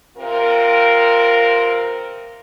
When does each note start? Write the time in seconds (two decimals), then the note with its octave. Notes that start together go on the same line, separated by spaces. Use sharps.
0.17 C3 C4 F4 A#4